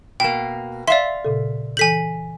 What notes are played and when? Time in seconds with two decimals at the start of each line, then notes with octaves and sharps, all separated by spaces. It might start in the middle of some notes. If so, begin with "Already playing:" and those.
0.20 B2 A#3 G5
0.88 D5 E5 F5 C6
1.25 A#2 C#3 A4
1.77 E3 A4 G#5 G6 B6 F#7